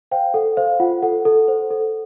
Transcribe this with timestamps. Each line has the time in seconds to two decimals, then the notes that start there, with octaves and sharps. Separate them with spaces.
0.11 C5 F5 G5
0.34 A4 F#5
0.57 C5 F5
0.80 F4 F#5
1.02 A4 F#5
1.25 A4
1.48 C5
1.71 A4